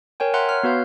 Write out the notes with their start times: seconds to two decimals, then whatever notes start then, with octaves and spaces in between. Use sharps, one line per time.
0.20 A#4 C#5 G5 G#5
0.34 E5 F#5 A#5 C6 F#6
0.49 C#5 F6
0.63 B3 F#4 B4 F5 G6